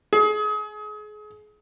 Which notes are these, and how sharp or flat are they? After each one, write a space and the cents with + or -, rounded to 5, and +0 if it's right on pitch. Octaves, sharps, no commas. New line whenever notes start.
G#4 +30